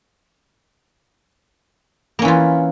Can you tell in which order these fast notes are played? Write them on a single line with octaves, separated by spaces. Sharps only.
A#3 C#4 E3 F4